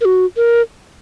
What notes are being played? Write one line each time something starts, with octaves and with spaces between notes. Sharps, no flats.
A#4
F#4
A#4